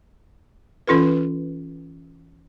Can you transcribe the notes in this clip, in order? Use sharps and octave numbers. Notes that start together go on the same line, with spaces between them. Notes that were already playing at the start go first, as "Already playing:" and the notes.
E3 C#4 F4 A4 B4